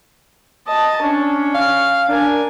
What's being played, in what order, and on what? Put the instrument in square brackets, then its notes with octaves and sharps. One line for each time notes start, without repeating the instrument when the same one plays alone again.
[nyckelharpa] D#5 A5
[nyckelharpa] C#4 [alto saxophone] D4
[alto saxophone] F5
[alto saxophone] D4 [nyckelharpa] A#4 G#5